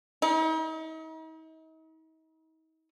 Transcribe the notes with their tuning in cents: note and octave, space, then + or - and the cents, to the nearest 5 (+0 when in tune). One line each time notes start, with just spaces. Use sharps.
D#4 +40